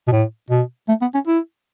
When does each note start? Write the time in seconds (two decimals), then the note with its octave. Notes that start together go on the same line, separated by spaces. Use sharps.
0.08 B2
0.12 A2
0.50 B2
0.88 A3
1.01 B3
1.14 C#4
1.27 E4